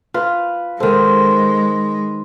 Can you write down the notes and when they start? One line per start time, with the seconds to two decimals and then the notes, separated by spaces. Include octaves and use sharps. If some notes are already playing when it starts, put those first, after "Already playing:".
0.14 F4 B4
0.80 D#3 G#3 A4 C5